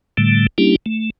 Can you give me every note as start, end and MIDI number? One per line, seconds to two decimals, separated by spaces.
0.17 0.47 45
0.17 0.47 50
0.17 0.47 55
0.17 0.47 57
0.58 0.76 55
0.58 0.76 58
0.58 0.76 61
0.58 0.76 62
0.58 0.76 64
0.58 0.76 67
0.86 1.10 57